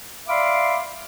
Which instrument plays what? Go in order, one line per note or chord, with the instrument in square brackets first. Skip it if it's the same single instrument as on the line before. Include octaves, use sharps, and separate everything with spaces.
[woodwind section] D5 E5 F5 B5 C6 D6